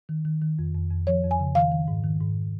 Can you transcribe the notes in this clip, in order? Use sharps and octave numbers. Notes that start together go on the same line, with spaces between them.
D#3
D#3
D#3
F2
F2
F2
F3 C#5
F2
G#5
C#3
D#3 F5
D#3
G#2
D#3
G#2